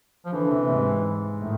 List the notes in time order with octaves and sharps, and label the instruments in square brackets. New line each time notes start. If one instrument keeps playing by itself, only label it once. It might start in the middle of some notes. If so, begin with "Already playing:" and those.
[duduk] F3
[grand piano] D3 [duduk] E3
[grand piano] C3
G#2
[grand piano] A2 [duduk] D#3